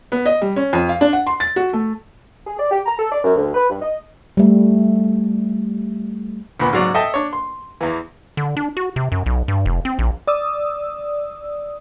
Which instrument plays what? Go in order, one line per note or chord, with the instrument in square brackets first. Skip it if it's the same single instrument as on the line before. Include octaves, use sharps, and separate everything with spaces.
[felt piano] B3
D#5
G3
C#4
F2
F5
D4
F#5
C6
A6
F#4
A3
[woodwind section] G#4
D5
G4
A#5
A4
D5
F#2
D2
B4
G2
D#5
[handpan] G3 A3
[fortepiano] D2 A#2 B3 B5
G#2 C#3 F#3 D5
A4 D#5 E5 G5 A5
D4 C#5
C6
E2 E3
[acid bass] D3
D4
F#4
C3
F#2
B1
G2
F1
C4
A#1
[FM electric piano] D5 D#6 E6